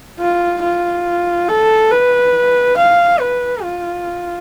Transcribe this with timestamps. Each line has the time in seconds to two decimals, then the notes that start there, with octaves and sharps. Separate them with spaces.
0.19 F4
0.62 F4
1.48 A4
1.91 B4
2.77 F5
3.20 B4
3.63 F4